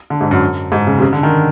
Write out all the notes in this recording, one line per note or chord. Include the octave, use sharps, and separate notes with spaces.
D3
G#2
F#2
G#2
C#3
C3
C#3
D3
D#3